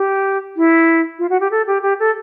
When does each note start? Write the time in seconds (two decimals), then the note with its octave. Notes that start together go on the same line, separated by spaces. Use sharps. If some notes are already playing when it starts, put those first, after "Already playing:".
Already playing: G4
0.57 E4
1.19 F4
1.30 F#4
1.40 G4
1.51 A4
1.67 G4
1.82 G4
2.00 A4